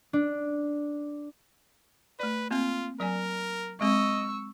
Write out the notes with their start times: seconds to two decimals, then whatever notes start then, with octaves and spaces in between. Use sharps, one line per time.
0.13 D4
2.19 A3 B4 D5
2.51 A#3 C4 F4
3.00 F#3 A#4 D5 G#5
3.81 G#3 C4 D#5 C#6 E6